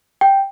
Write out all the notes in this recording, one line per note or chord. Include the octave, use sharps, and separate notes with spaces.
G5